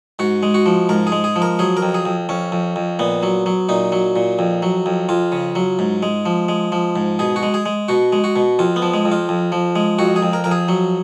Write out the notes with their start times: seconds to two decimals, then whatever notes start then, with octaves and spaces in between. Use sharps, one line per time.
0.19 G#2 F#4
0.43 G#3
0.54 F#4
0.66 F3
0.89 G#2 A#4
1.07 G#4
1.12 G#3
1.24 G#4
1.36 F3
1.42 A#4
1.59 F#3 G#4
1.77 A#4
1.82 F2
1.94 G#4
2.05 F2
2.29 F2 C#4
2.52 F2
2.76 F2
2.99 A#2 B3
3.23 F#3
3.46 F#3
3.69 A#2 D#4
3.92 F#3
4.16 A#2
4.39 F2
4.62 F#3
4.86 F2
5.09 F2 F4
5.32 C#3
5.55 F#3
5.79 G#2
6.03 G#3
6.26 F3
6.49 G#3
6.72 F3
6.96 G#2
7.19 B2 G#4
7.36 F#4
7.43 G#3
7.54 G#4
7.66 G#3
7.88 B2 F#4
8.12 G#3
8.24 F#4
8.36 B2
8.59 F2 F4
8.76 B3
8.82 F3
8.94 G#3
9.05 F2
9.12 F4
9.29 F2
9.52 F3
9.75 G#3
9.99 F2 F#4
10.16 G#4
10.23 F2
10.33 A#4
10.44 F2 A#4
10.51 G#4
10.68 F#3